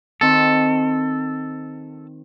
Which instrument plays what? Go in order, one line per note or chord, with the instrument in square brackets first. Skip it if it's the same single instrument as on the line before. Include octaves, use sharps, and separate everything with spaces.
[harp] D#3 C4 [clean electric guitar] A4